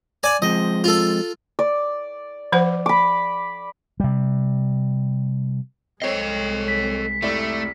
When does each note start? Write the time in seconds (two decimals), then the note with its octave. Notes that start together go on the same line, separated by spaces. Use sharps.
0.23 D5 G#5 A5
0.42 F3 G#3 C4 D#5
0.84 F4 A4
1.59 D5
2.52 F3 C5 F#5
2.86 B5 D6
4.00 C3 G3
6.02 C2 G#3 C4 A4 C#5 D#5 C7
6.68 B6
7.22 F1 A3 E4 D5